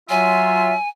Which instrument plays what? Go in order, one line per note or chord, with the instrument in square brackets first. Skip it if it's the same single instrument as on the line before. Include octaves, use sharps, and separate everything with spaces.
[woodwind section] F#3 F4 E5 [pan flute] G#5